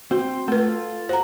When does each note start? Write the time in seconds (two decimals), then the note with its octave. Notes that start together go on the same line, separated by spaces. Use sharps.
0.11 C4 F#4 C5 C6
0.48 A3 F4 A4 B4
1.09 F#4 C5 A#5